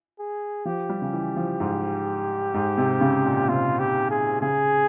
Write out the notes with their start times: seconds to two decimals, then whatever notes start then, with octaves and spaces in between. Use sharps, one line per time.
0.19 G#4
0.65 F3 G4
0.89 G3
1.02 C#3
1.13 E3
1.36 F3
1.60 G#2
2.54 G#2
2.78 C3
3.01 C#3
3.25 A#2
3.48 C3 F4
3.79 G4
4.11 G#4
4.42 C#3 G#4